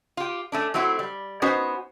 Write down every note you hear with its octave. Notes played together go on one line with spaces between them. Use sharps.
F4 G4
A3 C#4 D4
F#3 A3 C4 E4 F#4
G3
B3 C#4 D#4 F#4 C5